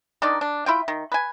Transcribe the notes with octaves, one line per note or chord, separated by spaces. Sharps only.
D#3 D4 D#4 D5
D4
E4 F4 G5
D#3
B4 G#5